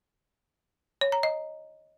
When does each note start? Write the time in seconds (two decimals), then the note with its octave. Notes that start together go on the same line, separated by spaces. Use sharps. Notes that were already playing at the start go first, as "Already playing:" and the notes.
1.01 C#5
1.12 A#5
1.23 D#5